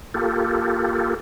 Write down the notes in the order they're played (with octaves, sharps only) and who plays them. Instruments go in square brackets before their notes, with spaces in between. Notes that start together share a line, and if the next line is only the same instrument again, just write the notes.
[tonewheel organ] A#3 F4 G4 A4